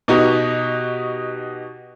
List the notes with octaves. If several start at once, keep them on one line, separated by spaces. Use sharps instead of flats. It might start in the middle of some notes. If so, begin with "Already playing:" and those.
B2 D#4 F#4 G4